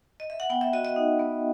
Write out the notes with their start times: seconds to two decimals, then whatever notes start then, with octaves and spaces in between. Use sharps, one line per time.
0.20 D#5
0.30 E5
0.40 F#5
0.50 B3 G5
0.61 E5
0.73 F#4 D#5
0.85 D#5
0.96 D#4
1.19 B3